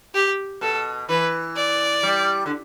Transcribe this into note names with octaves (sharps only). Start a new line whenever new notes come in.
G4
B2 A4
E3 B4
D5
G3
D3